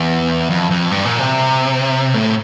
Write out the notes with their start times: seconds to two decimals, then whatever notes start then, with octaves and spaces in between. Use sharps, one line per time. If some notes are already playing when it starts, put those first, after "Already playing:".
Already playing: E2
0.50 F2
0.71 F2
0.91 G2
1.05 A#2
1.18 C3
2.14 A2